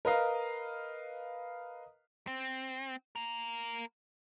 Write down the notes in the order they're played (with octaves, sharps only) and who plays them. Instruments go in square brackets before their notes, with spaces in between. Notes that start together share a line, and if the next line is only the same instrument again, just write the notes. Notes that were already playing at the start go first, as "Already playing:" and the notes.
[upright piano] A#4 B4 D#5 F5
[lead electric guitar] C4
A#3 A#4